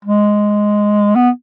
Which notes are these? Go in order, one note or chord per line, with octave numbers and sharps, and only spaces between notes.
G#3
B3